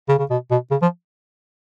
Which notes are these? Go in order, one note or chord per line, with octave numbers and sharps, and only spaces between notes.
C#3
C#3
B2
B2
C#3
F3